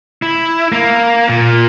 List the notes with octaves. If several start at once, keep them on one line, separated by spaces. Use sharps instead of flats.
E4
A#3
A#2